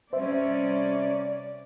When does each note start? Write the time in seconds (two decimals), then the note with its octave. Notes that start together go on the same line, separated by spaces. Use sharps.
0.13 C3 G3 C#4 C5 D5 E5